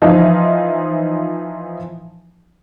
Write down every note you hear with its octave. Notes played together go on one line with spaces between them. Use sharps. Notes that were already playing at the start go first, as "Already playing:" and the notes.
E3 F3 D#4 F4